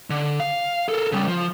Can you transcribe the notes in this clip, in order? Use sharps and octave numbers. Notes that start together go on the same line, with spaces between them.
D3
F5
A4 A#4
C#3 G3
F3